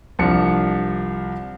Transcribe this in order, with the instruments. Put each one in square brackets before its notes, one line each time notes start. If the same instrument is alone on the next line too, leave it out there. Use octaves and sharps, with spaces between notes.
[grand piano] C2 F3 D4 C#7